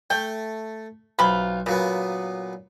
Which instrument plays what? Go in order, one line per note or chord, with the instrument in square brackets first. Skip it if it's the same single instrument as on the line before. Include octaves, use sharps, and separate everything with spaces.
[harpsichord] A3 [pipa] G5
[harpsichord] B1 [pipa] C3 F4 B5
[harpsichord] A#2 F#3 B3 [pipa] C#3